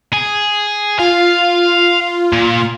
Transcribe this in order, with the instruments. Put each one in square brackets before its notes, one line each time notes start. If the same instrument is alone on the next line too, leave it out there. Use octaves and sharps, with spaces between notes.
[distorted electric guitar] G#4
[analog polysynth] F4 [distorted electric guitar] F5
[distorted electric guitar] A#2